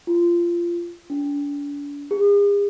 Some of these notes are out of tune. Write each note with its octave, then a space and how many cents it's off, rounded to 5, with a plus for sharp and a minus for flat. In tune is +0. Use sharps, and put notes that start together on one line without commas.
F4 -20
D4 -40
G#4 -45